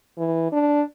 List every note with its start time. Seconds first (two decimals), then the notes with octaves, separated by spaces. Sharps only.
0.18 E3
0.52 D4